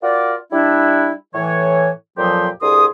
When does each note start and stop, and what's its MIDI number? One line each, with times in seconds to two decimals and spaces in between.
0.03 0.35 65
0.03 0.35 66
0.03 0.35 70
0.03 0.35 74
0.52 1.13 55
0.52 1.13 62
0.52 1.13 64
1.35 1.91 45
1.35 1.91 52
1.35 1.91 73
2.18 2.49 41
2.18 2.49 46
2.18 2.49 53
2.18 2.49 54
2.18 2.49 67
2.18 2.49 84
2.62 2.86 36
2.62 2.86 50
2.62 2.86 68
2.62 2.86 84
2.62 2.86 87